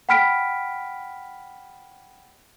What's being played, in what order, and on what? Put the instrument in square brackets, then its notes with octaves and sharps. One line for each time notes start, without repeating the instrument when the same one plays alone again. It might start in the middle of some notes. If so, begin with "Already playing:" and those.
[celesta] F#5 G5 B5 F6 B6 D7